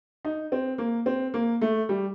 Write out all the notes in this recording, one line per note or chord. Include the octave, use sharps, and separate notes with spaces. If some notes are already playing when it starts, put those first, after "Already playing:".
D#4
C4
A#3
C4
A#3
A3
G3